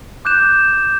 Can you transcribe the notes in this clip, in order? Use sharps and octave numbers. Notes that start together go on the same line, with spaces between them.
D6 F#6 G6 E7